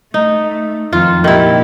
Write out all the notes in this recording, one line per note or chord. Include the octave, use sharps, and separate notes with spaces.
A3 D#4
F2 D#3 F4
A#2 D#3 E4 G4